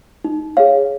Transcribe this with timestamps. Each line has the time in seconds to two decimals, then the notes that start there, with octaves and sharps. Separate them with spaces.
0.24 D#4
0.57 G#4 C#5 F5